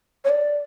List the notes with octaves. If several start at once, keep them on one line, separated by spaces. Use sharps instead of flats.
C#5
D5